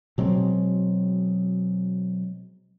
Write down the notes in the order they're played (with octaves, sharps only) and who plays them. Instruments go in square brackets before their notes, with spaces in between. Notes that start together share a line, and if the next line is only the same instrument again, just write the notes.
[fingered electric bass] B2 F#3 G#3 C4